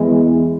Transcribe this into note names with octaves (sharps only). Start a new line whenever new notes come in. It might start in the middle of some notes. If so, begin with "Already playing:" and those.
Already playing: E2 E3 G#3